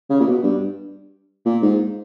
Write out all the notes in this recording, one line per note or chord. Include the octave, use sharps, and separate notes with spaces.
C#3
A#2
B2
G2
A#2
G#2